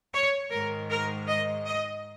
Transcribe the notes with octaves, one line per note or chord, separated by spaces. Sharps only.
C#5
G#2 D#3 G#3 A#4
A#4
D#5
D#5